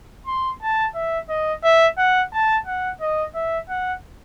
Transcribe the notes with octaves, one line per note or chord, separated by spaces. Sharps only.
C6
A5
E5
D#5
E5
F#5
A5
F#5
D#5
E5
F#5